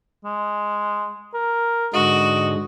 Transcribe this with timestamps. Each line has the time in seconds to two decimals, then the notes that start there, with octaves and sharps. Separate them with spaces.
0.25 G#3
1.34 A#4
1.94 G#2 D3 G#3 F#4 D#5